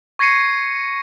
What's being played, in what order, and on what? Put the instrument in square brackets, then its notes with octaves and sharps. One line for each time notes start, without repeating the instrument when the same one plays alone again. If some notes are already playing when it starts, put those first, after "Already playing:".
[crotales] C#6 G#6 A#6 C7 C#7 D#7